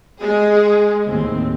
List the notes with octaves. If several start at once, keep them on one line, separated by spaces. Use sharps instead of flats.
G#3 G#4
D#2 A2 C4